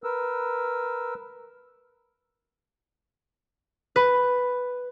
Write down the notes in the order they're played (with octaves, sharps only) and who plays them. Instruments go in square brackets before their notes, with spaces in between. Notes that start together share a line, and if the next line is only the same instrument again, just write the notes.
[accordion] A#4 B4 E6
[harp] B4